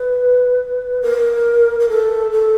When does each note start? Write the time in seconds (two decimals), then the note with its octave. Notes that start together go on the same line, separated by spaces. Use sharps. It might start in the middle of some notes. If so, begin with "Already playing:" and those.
Already playing: B4
1.02 A#4
1.80 A#4
1.89 A4
2.32 A4